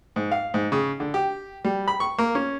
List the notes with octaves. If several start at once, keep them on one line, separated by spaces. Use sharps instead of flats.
G#2
F5
G#2
C#3
D3
G4
G3
B5
C#6
A#3
C#4